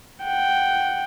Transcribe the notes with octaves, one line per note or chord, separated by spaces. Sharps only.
F#5 G5